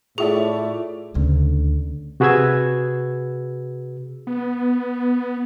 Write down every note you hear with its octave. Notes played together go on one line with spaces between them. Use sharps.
A2 F4 G#4 D5 E5 C#6
D2 C#3
C3 F#4 G#4 B4 E6 G#6
B3